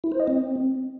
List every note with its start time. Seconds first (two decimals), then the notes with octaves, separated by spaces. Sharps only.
0.04 E4
0.12 C5
0.20 D#5
0.27 C4